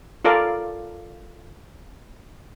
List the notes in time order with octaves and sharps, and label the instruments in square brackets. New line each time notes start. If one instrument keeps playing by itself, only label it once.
[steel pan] F4 A4 A#4 D5 F5